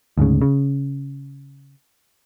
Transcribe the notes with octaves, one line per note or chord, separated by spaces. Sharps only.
D2 G#2 C#3
C#3